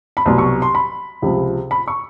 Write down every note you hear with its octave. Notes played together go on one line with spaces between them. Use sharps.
B5
C2 B2 F#3 C6
C#6
C6
B5
C#2 C3 F3
B5
C#6